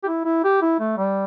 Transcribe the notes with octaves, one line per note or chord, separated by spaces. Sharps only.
G4
E4
E4
G4
E4
A3
G3